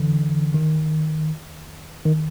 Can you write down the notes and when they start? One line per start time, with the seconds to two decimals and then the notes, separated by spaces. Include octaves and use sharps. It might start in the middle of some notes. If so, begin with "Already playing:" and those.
Already playing: D3 E3
0.54 D#3
2.06 D#3